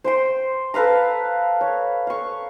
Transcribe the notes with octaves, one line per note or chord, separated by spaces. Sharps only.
C5 G5 C6
A4 B4 F5 A#5
C#5
F5 C#6